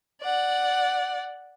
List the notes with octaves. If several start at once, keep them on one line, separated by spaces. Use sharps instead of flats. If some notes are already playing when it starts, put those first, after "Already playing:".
D5 F#5